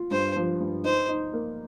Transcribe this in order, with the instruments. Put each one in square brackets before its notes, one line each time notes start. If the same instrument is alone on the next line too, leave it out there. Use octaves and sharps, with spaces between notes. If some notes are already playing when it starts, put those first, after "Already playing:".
Already playing: [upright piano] F4
[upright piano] G2 [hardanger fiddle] C5
[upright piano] F3
G2
[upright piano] D#4 [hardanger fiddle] C5
[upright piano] D#4
A#3